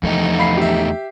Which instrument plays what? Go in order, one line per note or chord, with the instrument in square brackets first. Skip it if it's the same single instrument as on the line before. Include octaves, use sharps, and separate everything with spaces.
[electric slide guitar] E2 A3 D#4 [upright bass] F3
[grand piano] F5 B5 C7
G4 E5